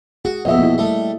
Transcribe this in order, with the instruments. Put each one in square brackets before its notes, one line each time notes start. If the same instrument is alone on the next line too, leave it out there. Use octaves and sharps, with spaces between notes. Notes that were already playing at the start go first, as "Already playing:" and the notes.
[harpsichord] F#4 [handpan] G#4
[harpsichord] A#1 F2 B2 [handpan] D#5 E5
[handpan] A#3 E4
[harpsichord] G3 A3